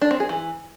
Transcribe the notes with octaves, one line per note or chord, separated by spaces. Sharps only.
D4
C4
G#4
E3